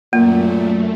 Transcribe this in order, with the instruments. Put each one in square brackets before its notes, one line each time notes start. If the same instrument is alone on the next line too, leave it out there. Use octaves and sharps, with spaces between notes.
[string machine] F#2 A3 [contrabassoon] A#2 [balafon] A#3